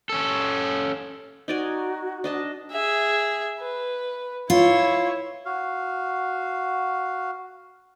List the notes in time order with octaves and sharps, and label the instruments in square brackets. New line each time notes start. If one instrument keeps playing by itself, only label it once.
[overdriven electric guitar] C#4 A4
[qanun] D#4 D5 G#5 [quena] F#4
[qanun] D4 D#5 A5
[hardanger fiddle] G#4 E5
B4
[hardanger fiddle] E4 C#5 [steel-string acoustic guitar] F4
[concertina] F#4 F5